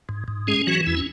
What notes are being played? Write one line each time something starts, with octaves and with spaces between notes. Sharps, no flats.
G#2
G#2
G#3 C#4 G#4
E3 F#3 F#4
E2 E4
C#4